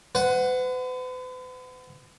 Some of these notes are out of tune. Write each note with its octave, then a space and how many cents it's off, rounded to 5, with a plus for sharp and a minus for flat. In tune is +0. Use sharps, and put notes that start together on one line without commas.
B4 +45 F#5 +0